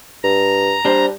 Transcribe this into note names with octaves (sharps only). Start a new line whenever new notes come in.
G2 A#5
G3 D4 C5